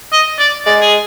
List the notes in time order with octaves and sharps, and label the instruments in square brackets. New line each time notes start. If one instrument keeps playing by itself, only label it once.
[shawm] D#5
D5
[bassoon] G#3 [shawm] D5
[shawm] G#4